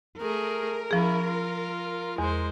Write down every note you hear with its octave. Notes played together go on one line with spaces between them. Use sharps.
A3 G#4 A#4
F3 C#4 E4 G#4
F4
E2 G#3 C5